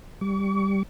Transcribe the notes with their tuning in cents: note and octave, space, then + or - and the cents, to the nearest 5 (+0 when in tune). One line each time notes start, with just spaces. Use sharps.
G3 +0 C#6 +45